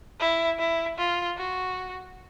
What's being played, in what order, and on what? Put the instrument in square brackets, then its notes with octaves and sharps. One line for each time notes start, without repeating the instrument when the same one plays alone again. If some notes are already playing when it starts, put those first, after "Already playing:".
[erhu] E4
E4
F4
F#4